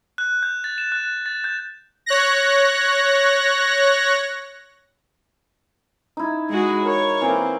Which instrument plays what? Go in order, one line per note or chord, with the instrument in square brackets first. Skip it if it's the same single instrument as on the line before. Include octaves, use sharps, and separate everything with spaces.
[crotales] F#6
G6
A6
E7
F#6
A6
G6
[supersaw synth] C#5 F#6 A#6
[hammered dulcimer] D#4 E4
[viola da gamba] G#3 F#4 G#4
[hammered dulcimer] A#4 C#6 [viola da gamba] C#5
[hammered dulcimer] E3 A#3 [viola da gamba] C4